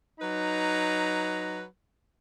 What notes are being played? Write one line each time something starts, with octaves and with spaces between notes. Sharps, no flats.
F#3 D#4 B4 A#5